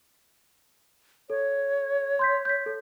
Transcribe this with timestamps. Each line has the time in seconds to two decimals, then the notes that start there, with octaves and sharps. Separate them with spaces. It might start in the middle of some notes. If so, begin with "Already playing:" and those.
1.30 A4 C#5
2.19 C6 G6 B6
2.45 G6 B6
2.66 A4